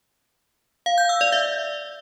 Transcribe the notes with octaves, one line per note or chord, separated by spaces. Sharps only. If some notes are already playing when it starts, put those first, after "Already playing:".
F5
G6
E6
D5
E5